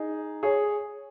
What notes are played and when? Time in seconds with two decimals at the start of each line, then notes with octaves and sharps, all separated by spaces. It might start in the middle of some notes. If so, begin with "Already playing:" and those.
Already playing: D#4 G#4
0.43 G#4 C#5